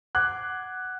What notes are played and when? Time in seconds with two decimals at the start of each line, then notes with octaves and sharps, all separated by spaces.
0.15 F#5 D6 F#6 G#6